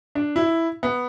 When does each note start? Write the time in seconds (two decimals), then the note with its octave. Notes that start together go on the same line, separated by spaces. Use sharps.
0.15 D4
0.36 E4
0.83 B3